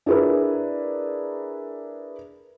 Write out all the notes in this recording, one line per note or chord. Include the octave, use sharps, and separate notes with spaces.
D4 E4 G#4 A#4 B4